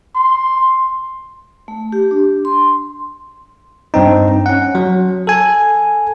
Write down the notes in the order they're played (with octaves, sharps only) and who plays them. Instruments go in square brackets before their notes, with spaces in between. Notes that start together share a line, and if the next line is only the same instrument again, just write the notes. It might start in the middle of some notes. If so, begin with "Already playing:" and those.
[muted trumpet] C6
[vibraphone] A3
G4
D4
C6
[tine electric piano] G2 C4 D#4
C#4 F#5
F#3
A4 G#5